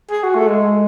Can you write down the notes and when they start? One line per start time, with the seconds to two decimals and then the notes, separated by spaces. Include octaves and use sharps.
0.11 G#4
0.23 F#4
0.35 A3
0.47 G#3